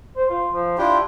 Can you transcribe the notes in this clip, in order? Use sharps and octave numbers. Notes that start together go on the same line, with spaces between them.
C5
F4
F3
D4 E4 F4 G4